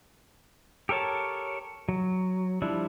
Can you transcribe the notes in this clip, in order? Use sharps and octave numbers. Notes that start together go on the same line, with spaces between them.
G4 A4 A#4 C#5 A5
F#3
F3 G3 D4 E4